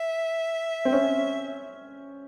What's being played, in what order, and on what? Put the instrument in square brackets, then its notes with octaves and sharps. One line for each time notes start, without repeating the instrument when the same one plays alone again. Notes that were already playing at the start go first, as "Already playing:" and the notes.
Already playing: [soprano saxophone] E5
[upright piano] C4
C#4